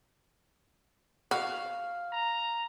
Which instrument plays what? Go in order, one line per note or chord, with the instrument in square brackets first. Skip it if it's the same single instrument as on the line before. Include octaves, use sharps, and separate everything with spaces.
[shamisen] F#4 [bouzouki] F5
[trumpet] A#5